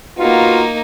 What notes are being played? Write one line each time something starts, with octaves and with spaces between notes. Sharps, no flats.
A#3 B3 D#4 F4 F#4